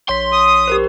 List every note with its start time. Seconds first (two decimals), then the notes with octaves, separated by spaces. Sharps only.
0.09 A#1 C#5 C6 B6
0.32 D#6
0.68 G4 A#4 C5